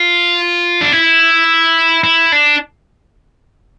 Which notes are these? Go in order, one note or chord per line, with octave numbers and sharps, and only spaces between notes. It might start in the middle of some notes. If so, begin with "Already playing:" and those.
Already playing: F4
D4
E4
E4
D4